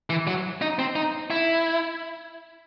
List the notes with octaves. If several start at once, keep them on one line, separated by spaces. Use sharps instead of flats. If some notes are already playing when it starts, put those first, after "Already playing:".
E3
F#3
D#4
C4
D#4
E4